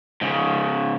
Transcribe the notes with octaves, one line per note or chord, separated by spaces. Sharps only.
G#2 C#3